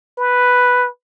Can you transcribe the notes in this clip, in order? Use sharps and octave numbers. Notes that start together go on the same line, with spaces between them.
B4